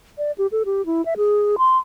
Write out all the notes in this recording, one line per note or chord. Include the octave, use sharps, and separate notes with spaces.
D5
G4
A4
G4
E4
E5
G#4
C6